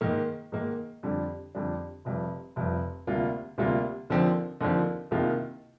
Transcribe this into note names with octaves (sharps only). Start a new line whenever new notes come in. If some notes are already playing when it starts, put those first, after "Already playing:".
G#2 D#3 A#3
G#2 D#3 A#3
F2 D3 G3 D4
F2 D3 G3 D4
F1 F2 C3 G3
F1 F2 C3 G3
D2 C3 G3 A#3 F4
D2 C3 G3 A#3 F4
D#2 D3 F3 C4
D#2 D3 F3 C4
C2 C3 D#3 A#3 F4